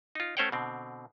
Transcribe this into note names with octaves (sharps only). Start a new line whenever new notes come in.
D#4 F4
A3 C#4 C5 C#5 F#5 G5
B2 D3 C4